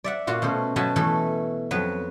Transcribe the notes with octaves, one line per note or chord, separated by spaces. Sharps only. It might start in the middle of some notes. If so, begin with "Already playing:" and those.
D5 E5 F#5
A#2 F4 F#4 F#5
B2 A3 C#4 C5
B2 F#3 F#4 G#5 A5 B5
B2 E3 A3 A4
F2 F#3 B3 B4